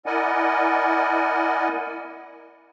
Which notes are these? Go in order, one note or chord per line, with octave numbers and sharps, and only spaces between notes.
E4 A#4 D5 D#5 F#5 G#5